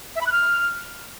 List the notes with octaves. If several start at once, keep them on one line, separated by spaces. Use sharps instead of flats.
E5
B5
F#6
F6